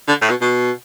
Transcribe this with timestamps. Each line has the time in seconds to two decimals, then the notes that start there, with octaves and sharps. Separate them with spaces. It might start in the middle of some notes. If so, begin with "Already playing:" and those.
0.08 D3
0.21 A2
0.30 B2
0.41 B2